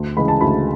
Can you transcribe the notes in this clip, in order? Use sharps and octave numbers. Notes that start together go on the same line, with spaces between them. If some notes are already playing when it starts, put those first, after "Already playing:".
Already playing: D2
C#3 E3 G#3 B5
A5
D2 B5